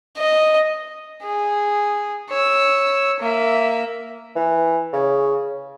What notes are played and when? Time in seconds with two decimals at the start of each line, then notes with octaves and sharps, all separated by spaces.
0.18 D#5
1.23 G#4
2.29 C#5 E6
3.20 A#3 E5
4.36 E3
4.93 C#3